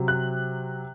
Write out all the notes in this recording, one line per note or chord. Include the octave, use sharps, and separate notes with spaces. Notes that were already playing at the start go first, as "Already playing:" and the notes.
Already playing: C3 F#3
F#6